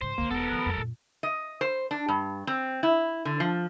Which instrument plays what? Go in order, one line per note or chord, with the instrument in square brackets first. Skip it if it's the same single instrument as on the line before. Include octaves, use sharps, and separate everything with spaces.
[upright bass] G#2 C#3 [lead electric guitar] C5
[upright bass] C#2 D3 [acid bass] A#3
[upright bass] E1 [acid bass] B3 [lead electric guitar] A4 A#4
[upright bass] D#3 F3
F2 F#3
F#2 A#2
[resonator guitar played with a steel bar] D#5
C5
D4
G2
C4
E4
D3
F3